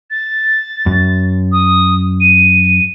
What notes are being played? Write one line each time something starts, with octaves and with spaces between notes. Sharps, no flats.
A6
F#2
D#6
D#7